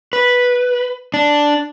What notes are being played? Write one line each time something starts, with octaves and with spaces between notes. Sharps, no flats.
B4
D4